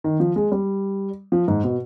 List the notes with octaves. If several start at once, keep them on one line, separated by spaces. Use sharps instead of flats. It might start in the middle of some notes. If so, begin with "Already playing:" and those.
D#3
F3
G#3
G3
F3
G#2
B2